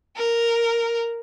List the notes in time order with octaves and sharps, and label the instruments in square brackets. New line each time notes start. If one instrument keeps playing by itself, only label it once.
[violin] A#4